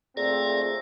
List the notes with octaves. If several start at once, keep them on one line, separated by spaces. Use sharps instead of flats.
A#2 A3 C4 G#4 D5 A#5